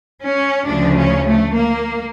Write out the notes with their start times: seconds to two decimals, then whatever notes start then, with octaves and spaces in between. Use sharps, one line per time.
0.23 C#4
0.67 D2 C#3 F3 D4
0.97 C#4
1.27 A3
1.55 A#3